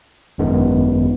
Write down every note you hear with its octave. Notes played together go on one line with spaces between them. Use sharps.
G#1 F#2 D#3 G#3 B3